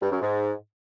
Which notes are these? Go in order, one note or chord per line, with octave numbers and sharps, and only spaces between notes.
G2
F#2
G#2